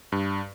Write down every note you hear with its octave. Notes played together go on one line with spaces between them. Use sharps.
G2